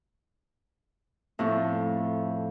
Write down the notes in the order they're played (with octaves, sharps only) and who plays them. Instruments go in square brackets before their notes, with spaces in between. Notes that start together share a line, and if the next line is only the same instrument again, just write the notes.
[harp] F2 A2